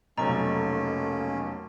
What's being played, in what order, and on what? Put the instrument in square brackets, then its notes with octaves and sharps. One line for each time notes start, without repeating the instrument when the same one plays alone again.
[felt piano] F1 B1 [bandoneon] A#3 C#4 [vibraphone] A4 G#5 [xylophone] A#5